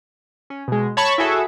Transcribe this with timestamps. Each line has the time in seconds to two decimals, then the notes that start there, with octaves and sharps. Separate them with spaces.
0.50 C#4
0.68 B2 G#3
0.97 C#5 A5 B5 C#6
1.18 E4 F#4 G#4 A4 E5